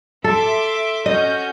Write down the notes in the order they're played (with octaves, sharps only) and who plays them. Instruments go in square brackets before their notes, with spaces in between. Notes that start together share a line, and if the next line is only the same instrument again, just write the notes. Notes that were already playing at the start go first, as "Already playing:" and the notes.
[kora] A4 [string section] E5 C6 D6
[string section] C#4 F#4 G6 [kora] D#5